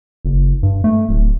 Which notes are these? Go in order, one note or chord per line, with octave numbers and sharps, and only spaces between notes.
F#1
G2
A3
D1